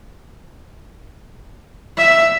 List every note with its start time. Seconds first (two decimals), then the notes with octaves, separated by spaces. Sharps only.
1.98 E5